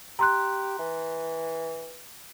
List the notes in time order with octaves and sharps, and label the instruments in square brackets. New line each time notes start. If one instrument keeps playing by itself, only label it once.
[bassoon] G4 [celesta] A#5 C6 F#6
[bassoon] E3